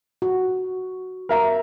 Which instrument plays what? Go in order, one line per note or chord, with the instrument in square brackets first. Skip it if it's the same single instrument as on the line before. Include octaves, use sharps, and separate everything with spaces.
[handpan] F#4
[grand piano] A#4 E5 A#5